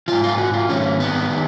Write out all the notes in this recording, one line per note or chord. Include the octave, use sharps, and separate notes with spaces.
G#2 D#3 F4
F4
F#4
F4
G#2 D#3 C#4
B3
D#3